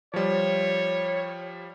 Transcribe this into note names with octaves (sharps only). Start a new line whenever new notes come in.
F3 G3 C#5